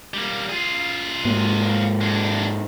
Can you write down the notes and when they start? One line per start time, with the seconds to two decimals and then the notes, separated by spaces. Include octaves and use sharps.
0.14 G3 A#3
0.49 F4 G#4
1.25 G#2 A#3
2.01 G#3 D4